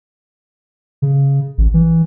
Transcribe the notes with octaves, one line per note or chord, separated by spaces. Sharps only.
C#3
A1
E3